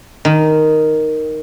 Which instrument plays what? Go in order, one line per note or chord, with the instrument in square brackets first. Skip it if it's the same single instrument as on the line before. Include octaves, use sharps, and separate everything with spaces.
[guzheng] D#3